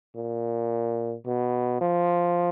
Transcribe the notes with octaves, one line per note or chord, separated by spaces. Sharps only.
A#2
B2
F3